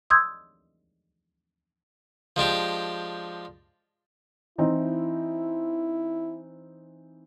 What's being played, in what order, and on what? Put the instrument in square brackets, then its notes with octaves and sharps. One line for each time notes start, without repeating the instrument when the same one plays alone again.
[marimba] C6 D#6 E6 G6 G#6
[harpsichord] F3 G#3 D4 G4
[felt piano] E3 C4 D#4 [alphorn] E4